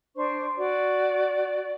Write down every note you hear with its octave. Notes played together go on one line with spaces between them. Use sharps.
D4 C5 C#6
F#4 D5